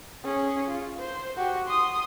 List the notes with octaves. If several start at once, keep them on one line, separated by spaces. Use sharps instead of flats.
C#4 G#4
F4
C5
F#4 G4
C6 D#6